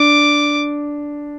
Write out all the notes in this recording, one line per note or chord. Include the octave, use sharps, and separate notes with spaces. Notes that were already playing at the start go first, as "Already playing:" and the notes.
Already playing: D4 D6